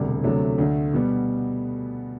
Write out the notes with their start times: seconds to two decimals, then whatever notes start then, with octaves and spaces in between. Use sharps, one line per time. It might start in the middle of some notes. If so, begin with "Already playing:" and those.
Already playing: E1 D2 C3 G3
0.24 D2 C3 F#3 A3 D4
0.58 D2 D3 A3
0.93 B2 G3 B3